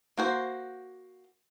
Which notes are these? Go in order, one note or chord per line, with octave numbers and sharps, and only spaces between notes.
A#3 F#4 C5